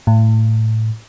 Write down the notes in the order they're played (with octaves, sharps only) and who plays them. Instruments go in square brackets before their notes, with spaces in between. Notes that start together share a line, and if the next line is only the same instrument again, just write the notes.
[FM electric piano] A2